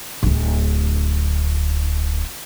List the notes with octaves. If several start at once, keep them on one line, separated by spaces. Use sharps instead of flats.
D1 D2